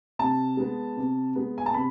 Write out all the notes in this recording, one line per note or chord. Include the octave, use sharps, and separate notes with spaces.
C3 A5
G#3 B3
C3
G#3 B3
G#5
A5
C3 B5